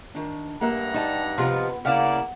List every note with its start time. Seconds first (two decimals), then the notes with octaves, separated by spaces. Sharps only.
0.15 D#3 D4
0.61 G2 A#3 G4 E5 F#5 A#5
0.94 G3 D#4 A5
1.38 C3 F3 B3 D#4 F4 B4
1.85 C#3 A#3 E4 D5 F5 F#5